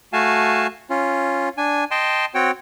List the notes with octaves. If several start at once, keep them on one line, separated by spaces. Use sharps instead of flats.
A3 F#4 F5 G#5 A5
C#4 F4
D4 G#5
D#5 G5 A5 C6
C4 F#4 C#5 G5